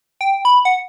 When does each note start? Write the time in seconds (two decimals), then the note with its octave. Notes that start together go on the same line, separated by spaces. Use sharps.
0.21 G5
0.45 B5
0.65 F#5